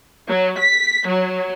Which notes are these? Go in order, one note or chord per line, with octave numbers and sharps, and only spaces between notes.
F#3
B6
F#3